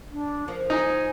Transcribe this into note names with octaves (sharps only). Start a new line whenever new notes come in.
D4
F3 A#4
D#4 G#5